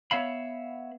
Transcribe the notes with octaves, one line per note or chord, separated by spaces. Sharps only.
B3 C#5 E5 F5 B5